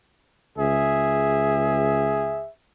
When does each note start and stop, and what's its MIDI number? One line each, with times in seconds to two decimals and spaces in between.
0.58 2.45 37
0.58 2.49 68
0.58 2.50 76